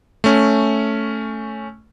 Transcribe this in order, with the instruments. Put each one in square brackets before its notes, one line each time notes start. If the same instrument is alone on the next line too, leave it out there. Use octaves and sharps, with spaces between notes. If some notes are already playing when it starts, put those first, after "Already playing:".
[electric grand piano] A3 C#4